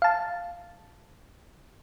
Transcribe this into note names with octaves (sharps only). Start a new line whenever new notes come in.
F5 A5